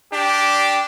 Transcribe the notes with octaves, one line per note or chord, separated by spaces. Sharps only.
D4 G4